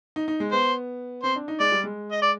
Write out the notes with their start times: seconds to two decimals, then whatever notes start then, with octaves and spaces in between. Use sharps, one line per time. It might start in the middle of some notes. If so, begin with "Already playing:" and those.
0.16 D#4
0.28 D#4
0.40 G#3
0.52 B3 C5
1.23 C4 C5
1.36 D4
1.48 D#4
1.60 G#3 D5
1.72 G3
1.84 G#3
2.12 D#5
2.22 D5